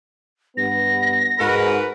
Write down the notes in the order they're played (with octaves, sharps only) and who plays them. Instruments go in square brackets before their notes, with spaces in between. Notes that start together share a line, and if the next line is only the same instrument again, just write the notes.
[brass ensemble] G2 B3 [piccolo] A#6
[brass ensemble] G#2 [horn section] F#4 A#4 B4